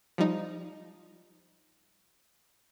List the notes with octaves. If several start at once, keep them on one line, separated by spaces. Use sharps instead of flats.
F3 G3 D#4